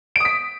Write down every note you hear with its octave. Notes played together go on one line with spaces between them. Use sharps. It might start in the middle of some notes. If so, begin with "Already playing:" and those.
D#6 B6 D7